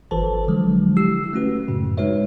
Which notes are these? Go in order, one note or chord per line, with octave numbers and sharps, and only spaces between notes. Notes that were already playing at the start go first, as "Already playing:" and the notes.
G1 E3 A4 B4 C5 A5
D3 F3 F#3 G#3
E4 G4 E6 C7
A3 C#4 F#4 B4
F#2 A2 C#3
G#3 D#4 F#4 B4 C#5 E5